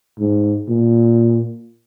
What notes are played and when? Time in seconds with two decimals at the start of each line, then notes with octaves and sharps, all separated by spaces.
0.19 G#2
0.69 A#2